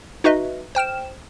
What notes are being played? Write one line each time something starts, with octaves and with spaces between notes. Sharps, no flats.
D#4 F#4 B4 D#5 E5
C5 G5 F6 E7